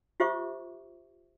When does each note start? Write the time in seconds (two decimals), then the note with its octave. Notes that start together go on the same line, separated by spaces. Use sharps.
0.20 F4 G4 C5 E5 C#6 D6